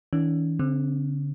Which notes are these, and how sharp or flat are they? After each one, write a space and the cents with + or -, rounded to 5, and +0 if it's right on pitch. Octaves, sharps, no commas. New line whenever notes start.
E3 -45 C#4 +40
D3 -40 C4 +5